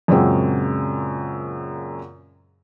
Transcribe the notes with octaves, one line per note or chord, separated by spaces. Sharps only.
F#2 A#2 C#3 F#3 G#3 C4